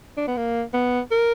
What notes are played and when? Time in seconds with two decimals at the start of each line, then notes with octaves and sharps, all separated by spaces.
0.17 D4
0.27 B3
0.37 A#3
0.74 B3
1.11 A#4